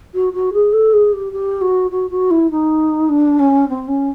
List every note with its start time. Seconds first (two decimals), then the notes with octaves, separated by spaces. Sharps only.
0.15 F#4
0.33 F#4
0.53 G#4
0.73 A4
0.93 G#4
1.13 G4
1.33 G4
1.61 F#4
1.91 F#4
2.10 F#4
2.31 E4
2.51 D#4
3.09 D4
3.39 C#4
3.69 C4
3.88 C#4